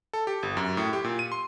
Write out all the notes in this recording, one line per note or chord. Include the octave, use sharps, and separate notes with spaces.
A4
G4
G1
F#2
A2
G4
A#2
D#7
C6